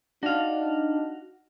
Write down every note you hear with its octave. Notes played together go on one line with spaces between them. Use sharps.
D4 D#4 F#4 F5